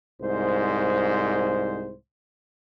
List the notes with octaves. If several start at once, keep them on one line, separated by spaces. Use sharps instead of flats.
C2 G#2 C5